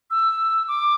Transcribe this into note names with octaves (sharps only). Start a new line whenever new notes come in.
E6
D6